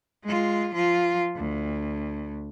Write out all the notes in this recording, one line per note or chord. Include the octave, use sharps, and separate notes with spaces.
G#3 F4
F3 F4
D2